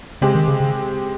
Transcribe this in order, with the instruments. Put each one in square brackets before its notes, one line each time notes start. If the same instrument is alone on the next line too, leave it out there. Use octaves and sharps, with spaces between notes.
[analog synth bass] C#3 [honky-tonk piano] G#3 C4 G4
[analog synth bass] D#3
C#3
C#3